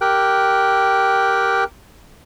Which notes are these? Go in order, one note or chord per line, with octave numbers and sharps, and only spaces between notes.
G4 A#4 G5 F#6